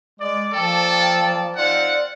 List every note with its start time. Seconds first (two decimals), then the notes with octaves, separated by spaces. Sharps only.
0.20 G#3 D5
0.53 F3 A#3 A4 D5 G5 A5
1.56 C4 D#4 F4 D5 F#5